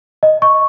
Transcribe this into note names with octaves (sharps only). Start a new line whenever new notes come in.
D#5
C#6